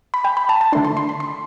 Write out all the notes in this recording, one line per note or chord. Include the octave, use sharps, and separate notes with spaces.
B5
G5
B5
A5
A5
D3 A3 D4 C6
C6
C6
B5
C6